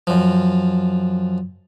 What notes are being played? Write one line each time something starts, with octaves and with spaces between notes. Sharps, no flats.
F#2 F3